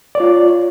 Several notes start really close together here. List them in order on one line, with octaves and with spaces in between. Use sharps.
D5 C#5 F4